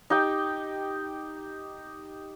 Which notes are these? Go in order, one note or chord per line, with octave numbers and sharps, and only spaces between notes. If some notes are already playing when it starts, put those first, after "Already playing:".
D#4 G4 G5